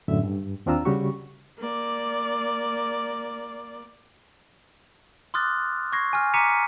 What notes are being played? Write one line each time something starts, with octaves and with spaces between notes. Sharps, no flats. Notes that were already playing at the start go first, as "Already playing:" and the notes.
F#2 A2 D3 E5
G2
D#2 C4 D4 F4 A#5 E6
C#3 G3 F#4 G4 C#6
A#3 D5
C6 D6 D#6 F6 F#6 A6
C#6 G#6 A#6 C7
G#5 F6
A#5 D6 B6 C#7 D#7